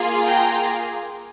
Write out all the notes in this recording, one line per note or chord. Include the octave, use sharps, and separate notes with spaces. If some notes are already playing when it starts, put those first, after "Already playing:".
Already playing: A#3 F4 G#4
G5 A#5